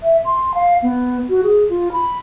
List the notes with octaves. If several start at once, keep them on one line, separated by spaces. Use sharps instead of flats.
E5
C6
F5
B3
F#4
G#4
F4
B5